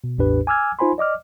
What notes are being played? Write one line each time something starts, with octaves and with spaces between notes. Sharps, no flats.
B2
A1 E2 A2 D4 G4 B4
G#5 D6 E6 F6 G#6
D#4 F4 C5 G#5 B5 C6
D5 D#5 D6 F6